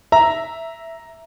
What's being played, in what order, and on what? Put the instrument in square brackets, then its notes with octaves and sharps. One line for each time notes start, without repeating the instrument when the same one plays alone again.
[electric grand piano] E5 [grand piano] A#5